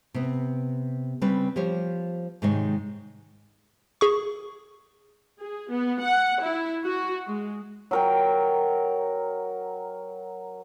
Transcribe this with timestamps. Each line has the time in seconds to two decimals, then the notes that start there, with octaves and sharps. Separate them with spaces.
0.14 C3 B3
1.22 C#3 G3 C4 C#4 B4
1.56 F3 G4 C5 C#5
2.42 G#2 C3 D#3 G#3 D#4 C#5
4.01 G#4 C#6
5.39 G#4
5.70 B3
6.00 F#5
6.41 E4
6.84 F#4
7.26 G#3
7.91 F#3 A#4 G5